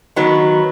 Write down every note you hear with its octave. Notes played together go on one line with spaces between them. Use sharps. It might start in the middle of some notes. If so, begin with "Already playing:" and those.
D#3 F#3 B3